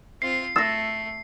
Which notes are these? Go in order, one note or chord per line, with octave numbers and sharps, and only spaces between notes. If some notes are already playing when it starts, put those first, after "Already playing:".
C4 F4 C7
A3 E6 A6 A#6